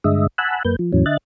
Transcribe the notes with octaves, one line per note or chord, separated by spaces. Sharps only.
G2 D3 G#3 D#5 E5
F#5 G#5 A5 B5 E6 F#6
F#2 A#3 B4 G6
F3
E2 A2 E3 F#3 C#4
D3 D#5 E5 F#6 A6